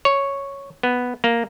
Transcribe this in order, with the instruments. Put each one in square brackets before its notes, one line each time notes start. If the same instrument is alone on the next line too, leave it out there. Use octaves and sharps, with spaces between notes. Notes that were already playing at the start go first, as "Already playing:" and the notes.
[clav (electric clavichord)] C#5
B3
A#3